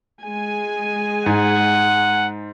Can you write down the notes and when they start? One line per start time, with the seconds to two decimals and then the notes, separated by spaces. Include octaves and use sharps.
0.23 G#3 G#5
1.26 G#2 F#5